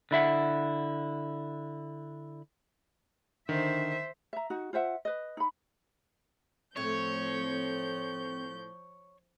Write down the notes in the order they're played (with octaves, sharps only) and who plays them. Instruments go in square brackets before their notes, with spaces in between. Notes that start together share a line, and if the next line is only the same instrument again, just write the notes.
[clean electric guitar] D3 E4 E5 F#5
[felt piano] D3 [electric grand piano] D#3 [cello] C5 E5
[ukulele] E5 A#5
D#4 F#4
F4 C5 E5 F#5
B4 D#5
D#4 B5
[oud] A2 A3 [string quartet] F3 G6 [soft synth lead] C4 [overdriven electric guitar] C#5